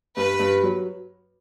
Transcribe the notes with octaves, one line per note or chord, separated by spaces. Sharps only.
G2 B4
G2
F#3